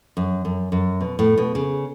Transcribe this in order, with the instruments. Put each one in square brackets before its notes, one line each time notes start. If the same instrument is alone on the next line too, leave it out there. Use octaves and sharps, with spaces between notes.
[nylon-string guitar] F#2
F#2
F#2
B2
A2
B2
C#3